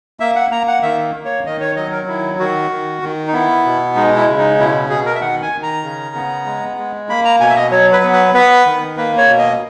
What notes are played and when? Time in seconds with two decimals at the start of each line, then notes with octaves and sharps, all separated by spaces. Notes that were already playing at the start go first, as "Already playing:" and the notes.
0.20 A#3 E5
0.36 F#5
0.51 A#3 A#5
0.68 F#5
0.82 D#3 E5
1.14 A#3
1.25 C#5
1.45 D#3 D#5
1.61 C#5
1.76 F#3 D#5
1.92 A#4
2.07 D#3 E4
2.39 D#3 F#4
2.71 D#3
3.02 D#3
3.27 D#4
3.33 B3 E4
3.65 B2
3.95 G#3 D#4
4.17 E4
4.27 C#3
4.38 D#4
4.59 B2 E4
4.89 B2 G#4
5.06 A#4
5.15 E5
5.21 D#3 F#5
5.42 G#5
5.52 D#3
5.63 A#5
5.83 C#3
6.15 B3
6.46 G#3
6.77 G#3
7.09 A#3 B5
7.25 A#5
7.40 B2 G#5
7.50 E5
7.56 D#5
7.71 F#3 C#5
7.92 B4
8.03 B3
8.13 B4
8.34 B3 B4
8.66 D#3
8.97 A#3 B4
9.17 C#5
9.29 B2
9.38 D#5